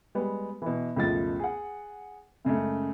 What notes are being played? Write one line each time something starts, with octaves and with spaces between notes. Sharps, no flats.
G3 G#3 B3
B2 E3
C#2 F#2 B2 F3 A3 A6
G#4 F#5
F#2 C#3 G#3 A3